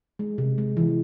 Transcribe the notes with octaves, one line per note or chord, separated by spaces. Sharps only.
G#3
C3
G#3
E3